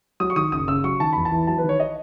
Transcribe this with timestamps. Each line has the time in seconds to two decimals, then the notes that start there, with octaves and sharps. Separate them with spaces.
0.20 F#3 D#6
0.30 C#6
0.36 D#3 D#6
0.52 F#1 D#6
0.68 C#3 E6
0.84 F#3 C#6
1.00 D#3 A5
1.13 E2 B5
1.25 A5
1.32 E3
1.47 F#3 A5
1.58 B4
1.64 D#3
1.69 C#5
1.80 D#5